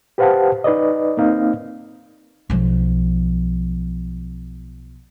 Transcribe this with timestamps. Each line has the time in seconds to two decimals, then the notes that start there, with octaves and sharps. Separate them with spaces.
0.18 G4 B4 C5 F5 F#5 A5
0.64 D#4 B4 D5 D#5
1.17 A#3 C4 D#4 F5
2.50 B1 F3